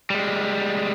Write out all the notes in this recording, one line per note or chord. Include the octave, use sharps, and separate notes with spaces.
G3 G#3